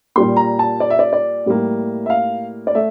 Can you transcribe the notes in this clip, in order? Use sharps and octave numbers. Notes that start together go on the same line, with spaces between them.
A#2 G3 A#3 C6
A#5
A5
D5
E5
D5
D5
A2 G3 A#3
E5
F5
D5
A3 E5